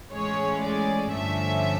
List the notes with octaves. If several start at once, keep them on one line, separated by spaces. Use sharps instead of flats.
A2 E3 G#3 C#4 C#5
D5
G2 D3 F3 A3 C#4 E5